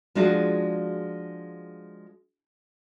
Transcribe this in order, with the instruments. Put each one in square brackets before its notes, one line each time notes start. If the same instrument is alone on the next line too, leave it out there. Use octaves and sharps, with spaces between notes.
[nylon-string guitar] F3 G#3 D4 F4 F#4 G#4